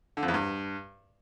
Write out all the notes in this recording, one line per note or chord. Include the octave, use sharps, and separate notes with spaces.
D3
F2
E2
G2